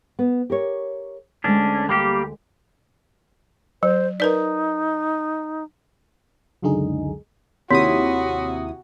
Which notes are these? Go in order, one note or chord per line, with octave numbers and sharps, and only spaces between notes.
B3
G4 A#4 C#5
D2 G#3 C#4 D4
G3 A#3 G4
F#3 C5
D#4 A#4 B4 D5
C#2 F#2 D3 G#3 D#4 G#4
D#2 C3 E4 F#4 C#5 C6 D#6 B6